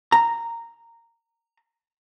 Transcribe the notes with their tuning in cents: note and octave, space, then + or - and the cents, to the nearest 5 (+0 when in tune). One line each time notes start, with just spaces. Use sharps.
A#5 -10